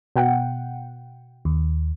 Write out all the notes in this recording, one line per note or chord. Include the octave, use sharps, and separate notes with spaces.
B2 F#5 G5
D#2